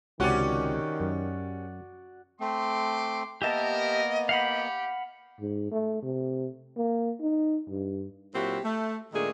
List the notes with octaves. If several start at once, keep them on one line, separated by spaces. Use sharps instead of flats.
C#2 C3 D#3 C#4 F#4 G4 D5
F#2
A3 C4 C6 D6
A#3 B3 G4 A#4 D#5 E5 A5
G4 F5 F#5 B5
G#2
A3
C3
A#3
D#4
G2
A#2 F#3 C4 E4 F#4 G4
A3
A#2 D#3 G#3 A3 D4 G#4